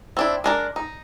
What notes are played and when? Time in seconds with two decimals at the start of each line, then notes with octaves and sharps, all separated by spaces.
0.17 C4 D4 E4
0.44 G#3 D4 A#4
0.76 D#4